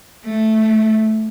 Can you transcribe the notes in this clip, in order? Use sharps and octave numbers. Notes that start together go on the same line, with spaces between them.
A3